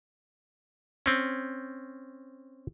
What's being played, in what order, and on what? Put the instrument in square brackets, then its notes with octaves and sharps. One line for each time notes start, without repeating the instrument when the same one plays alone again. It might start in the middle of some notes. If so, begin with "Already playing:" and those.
[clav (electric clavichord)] C4 C#4